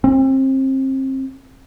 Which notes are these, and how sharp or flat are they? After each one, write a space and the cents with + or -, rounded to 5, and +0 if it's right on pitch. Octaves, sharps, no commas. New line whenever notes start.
C4 +30